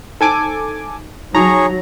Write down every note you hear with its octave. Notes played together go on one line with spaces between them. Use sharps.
D#4 A4 C5 G#5 A5 D6
F#3 D#4 G#4 C#5 D#5 A#5